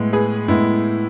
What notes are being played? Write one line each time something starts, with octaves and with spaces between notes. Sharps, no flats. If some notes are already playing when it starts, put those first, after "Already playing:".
Already playing: A2 G#3 B3
G#4 B4
A2 G#3 B3 E4